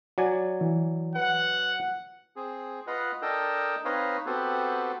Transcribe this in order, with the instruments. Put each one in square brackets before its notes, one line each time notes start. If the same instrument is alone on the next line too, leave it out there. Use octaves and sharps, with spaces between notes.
[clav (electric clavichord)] F#3 D5 G#5 [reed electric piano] F#4
[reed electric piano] E3
[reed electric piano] B4 [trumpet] F#5
[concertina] C4 G#4
F4 B4 D#5 F5 F#5
D4 A4 A#4 D#5 G5 E6
C4 D#4 B4 C#5 D#5 F5
B3 C4 F#4 G4 A4